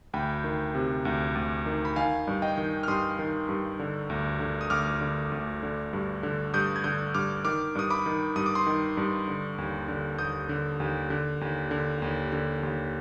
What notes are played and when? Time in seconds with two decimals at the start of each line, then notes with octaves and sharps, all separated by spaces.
0.14 D2 G5 B5
0.44 D#3
0.75 C3
1.05 D2
1.36 D2
1.66 D#3
1.85 B5
1.96 D#3 F5 G#5
2.28 G2
2.42 D#5 G5
2.57 D#3
2.83 F6
2.88 G2 C6 D#6
3.19 D#3
3.49 G2
3.79 D3
4.10 D2
4.40 D3
4.61 D#6
4.70 D2 D6 F6
5.01 D3
5.32 D2
5.63 D3
5.93 G2
6.23 D3
6.54 G2 D#6 G6
6.76 G#6
6.84 D3 D#6 G6
7.14 G2 D6 F6
7.45 D#3 D6 F6
7.75 G2 D#6
7.90 B5 D6
8.06 D#3
8.36 G2 D#6
8.46 D6
8.55 C6 D#6
8.67 D#3
8.97 G2
9.28 D3
9.58 D#2
9.88 D3
10.18 D#2 D#6 G6
10.49 D3
10.80 D#2
11.10 D3
11.41 D#2
11.71 D3
12.02 D#2
12.33 D3
12.63 D#2